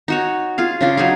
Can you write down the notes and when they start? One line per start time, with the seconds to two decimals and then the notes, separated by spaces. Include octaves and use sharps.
0.08 D#4 F#4 C#5
0.58 F4 G#4 F5
0.81 C#3 D4 F4
0.97 F#3 D#4 G#4 F5